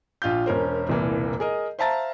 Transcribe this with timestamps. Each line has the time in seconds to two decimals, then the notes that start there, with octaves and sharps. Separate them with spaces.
0.22 A#1 F4 F5 G6
0.46 E1 C#4 A#4 C5
0.89 E1 C2 A#2 E3 A#3
1.40 G#4 A#4 D#5
1.79 C5 E5 F5 A5 A#5 A6